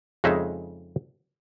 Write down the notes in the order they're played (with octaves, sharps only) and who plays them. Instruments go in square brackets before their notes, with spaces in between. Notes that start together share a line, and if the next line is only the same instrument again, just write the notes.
[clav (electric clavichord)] F2 C#3 G#3 D#4 E5